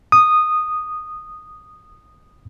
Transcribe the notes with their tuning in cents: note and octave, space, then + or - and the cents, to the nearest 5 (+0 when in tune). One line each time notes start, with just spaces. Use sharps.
D#6 -10